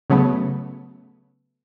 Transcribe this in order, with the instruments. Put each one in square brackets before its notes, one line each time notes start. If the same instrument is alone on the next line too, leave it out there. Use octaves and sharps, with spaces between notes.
[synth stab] C#3 F#3 A3 B3